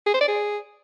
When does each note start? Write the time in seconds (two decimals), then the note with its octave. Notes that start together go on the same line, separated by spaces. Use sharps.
0.07 G#4
0.14 C5
0.21 D5
0.28 G#4